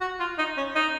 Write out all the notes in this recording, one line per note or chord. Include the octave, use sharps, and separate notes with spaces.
F#4
F4
D#4
C#4
D#4